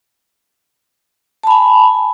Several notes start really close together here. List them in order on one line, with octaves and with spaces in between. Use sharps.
A5 B5 G#5